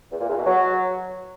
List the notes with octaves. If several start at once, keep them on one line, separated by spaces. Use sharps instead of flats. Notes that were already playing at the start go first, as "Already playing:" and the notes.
E2
A#2
E2
B2
F#3